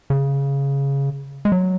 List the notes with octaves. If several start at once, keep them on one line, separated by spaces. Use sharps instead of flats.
C#3
G#3
F#3